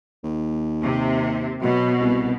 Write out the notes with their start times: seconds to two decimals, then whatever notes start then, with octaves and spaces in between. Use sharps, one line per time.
0.24 D#2
0.83 C3
1.62 B2 F#3
2.01 C2